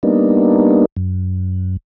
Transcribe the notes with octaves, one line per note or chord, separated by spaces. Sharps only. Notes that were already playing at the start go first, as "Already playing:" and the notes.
G3 A#3 B3 D4 D#4
F#2